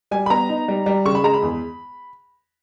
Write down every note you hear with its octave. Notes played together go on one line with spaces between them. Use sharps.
G3 G#5
B5
B3 A#5
D#4
G3
G3
C#3 C#6
B5
G#3 A#5
B5
E2